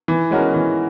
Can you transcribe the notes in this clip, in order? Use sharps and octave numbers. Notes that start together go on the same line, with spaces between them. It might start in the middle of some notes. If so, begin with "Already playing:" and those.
E3
G#3 C#4 F#4 A#4
E3